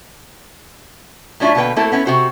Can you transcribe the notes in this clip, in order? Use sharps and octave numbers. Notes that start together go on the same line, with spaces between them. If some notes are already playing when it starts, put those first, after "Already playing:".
A2 F#3 D4 E4 F4 E5
B2 D3 A#3 B4 G5
A3 A#3 C4 E4 F#4 A4
B3 C#4 E4
C3 F#4 C5